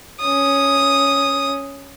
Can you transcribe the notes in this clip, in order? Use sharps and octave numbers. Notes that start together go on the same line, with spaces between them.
C#4 D#6